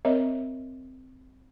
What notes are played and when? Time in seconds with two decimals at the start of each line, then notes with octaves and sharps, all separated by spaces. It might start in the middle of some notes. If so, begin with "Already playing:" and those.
0.05 C4 A#4 C#5 D#5 E5